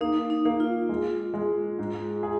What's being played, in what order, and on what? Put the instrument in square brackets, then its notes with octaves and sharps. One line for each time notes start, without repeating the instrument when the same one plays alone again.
[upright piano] A#3 [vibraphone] D#4
[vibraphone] D#4
[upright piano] A#3
[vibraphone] F4
[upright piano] G#3
G#3
G#2
G#4